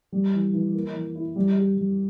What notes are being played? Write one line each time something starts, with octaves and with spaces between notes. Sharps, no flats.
G3
E3
E3
A#3
E3
E4
G3
G4
G3